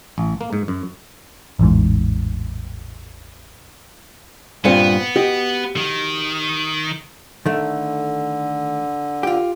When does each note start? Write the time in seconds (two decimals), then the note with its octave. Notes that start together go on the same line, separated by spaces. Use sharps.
0.18 A1
0.41 A#3
0.53 G#2
0.68 F#2
1.59 A1 E2 G#2
4.65 G2 A#2 B3 C4
5.16 F#4 G4 D#5
5.77 D#3
7.46 D3 D#3 A3
9.23 F4 G4